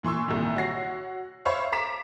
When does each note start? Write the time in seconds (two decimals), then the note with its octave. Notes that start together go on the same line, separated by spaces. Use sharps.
0.03 A#2 E3 C6 C#6 E6
0.28 C2 A#2 D#3
0.56 F#4 C#5 A#6 C7
1.45 C5 C#5 E5 F5 B5 C#6
1.72 A#5 D6 B6 E7